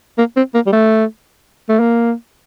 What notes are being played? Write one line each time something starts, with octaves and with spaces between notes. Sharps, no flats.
A#3
C4
A#3
G3
A3
A3
A#3